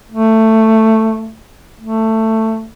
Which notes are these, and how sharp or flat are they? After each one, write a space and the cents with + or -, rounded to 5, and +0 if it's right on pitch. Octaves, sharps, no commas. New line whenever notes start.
A3 +10
A3 +15